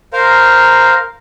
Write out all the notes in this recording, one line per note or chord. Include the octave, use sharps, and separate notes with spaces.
A#4 C5 F5 A#5